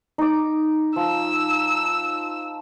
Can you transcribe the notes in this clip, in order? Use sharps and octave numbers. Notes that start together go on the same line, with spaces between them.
D#4 D6
F3 E6